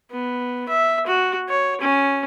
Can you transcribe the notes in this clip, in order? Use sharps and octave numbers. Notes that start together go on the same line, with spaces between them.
B3
E5
F#4
C#5
C#4